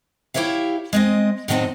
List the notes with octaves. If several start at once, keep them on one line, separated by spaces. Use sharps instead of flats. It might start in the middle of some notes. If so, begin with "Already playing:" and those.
E4 G4 A#4 C#5 E5 F5
G#3 C4 D#5
A2 D#3 F#3 C4 D4 D#4